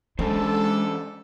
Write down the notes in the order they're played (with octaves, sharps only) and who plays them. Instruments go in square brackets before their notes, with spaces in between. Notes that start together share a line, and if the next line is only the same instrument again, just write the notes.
[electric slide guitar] E3 C#4 C5 [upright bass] G#3 [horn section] D4 A4